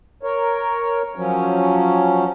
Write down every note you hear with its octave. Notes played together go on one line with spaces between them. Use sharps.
A#4 C#5
F3 F#3 C#4